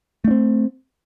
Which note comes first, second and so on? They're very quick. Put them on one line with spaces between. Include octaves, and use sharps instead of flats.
A3 D4 C4